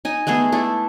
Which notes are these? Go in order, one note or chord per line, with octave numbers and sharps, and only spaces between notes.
D#4 G#5
G#3 A3 B3 G#4
A3 D4 E4